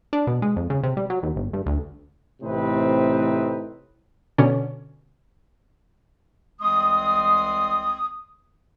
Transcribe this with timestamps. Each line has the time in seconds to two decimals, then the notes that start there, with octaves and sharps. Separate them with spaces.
0.13 D4
0.27 B2
0.42 G#3
0.56 F2
0.70 C#3
0.83 C3
0.97 G3
1.10 F#3
1.23 D#2
1.36 G1
1.53 G2
1.66 D2
2.42 A1 A2 C3 C4 D#4 B4
4.38 B2 D3 C#4
6.61 C2 E3 G#3 C4 C6 D#6